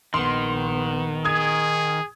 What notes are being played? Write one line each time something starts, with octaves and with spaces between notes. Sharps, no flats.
A#1 D#3 B3 C6
G#4 D#6 G#6